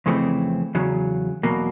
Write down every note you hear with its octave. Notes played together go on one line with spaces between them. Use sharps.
F2 C#3 E3 A3 C4
E2 C#3 F#3
E2 B2 F#3 A#3